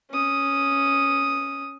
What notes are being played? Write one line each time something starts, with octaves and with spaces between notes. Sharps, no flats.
C#4 D#6